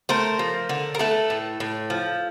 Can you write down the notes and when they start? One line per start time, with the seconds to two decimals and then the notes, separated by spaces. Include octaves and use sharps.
0.09 A3 A#4 C5
0.39 F3
0.69 D3
0.95 A#4
0.99 A3 A4 B4
1.30 A2
1.60 A2
1.90 F3